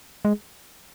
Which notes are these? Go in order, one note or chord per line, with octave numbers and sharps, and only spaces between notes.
G#3